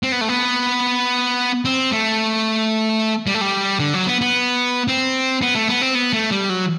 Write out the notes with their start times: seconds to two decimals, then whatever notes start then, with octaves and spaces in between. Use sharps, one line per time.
0.03 C4
0.12 B3
0.21 A3
0.29 B3
1.65 C4
1.92 A3
3.27 G3
3.34 A3
3.41 G3
3.80 D3
3.94 F#3
4.07 B3
4.21 B3
4.88 C4
5.42 B3
5.55 A3
5.69 B3
5.82 C4
5.95 B3
6.13 A3
6.31 G3
6.49 F#3